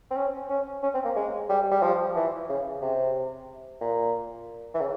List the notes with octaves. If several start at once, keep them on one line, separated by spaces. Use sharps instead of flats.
C4
C#4
C#4
C#4
C4
A#3
G#3
G3
G3
F3
E3
C#3
C3
A#2
E3
C#3